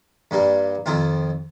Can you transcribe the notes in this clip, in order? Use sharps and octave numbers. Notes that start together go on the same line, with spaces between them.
G2 G3 A#3
F2 D#3 C4 F4